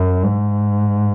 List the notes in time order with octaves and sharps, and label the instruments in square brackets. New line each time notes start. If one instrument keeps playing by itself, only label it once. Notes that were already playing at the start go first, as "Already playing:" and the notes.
Already playing: [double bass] F#2
G#2